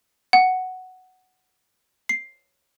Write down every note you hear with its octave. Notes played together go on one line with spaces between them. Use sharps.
F#5
C7